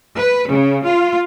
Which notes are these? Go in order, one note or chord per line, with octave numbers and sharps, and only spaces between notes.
B4
C#3
F4